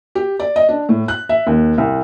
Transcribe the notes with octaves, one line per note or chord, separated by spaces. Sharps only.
G4
D5
D#5
D4
A2
F#6
E5
D#2
C2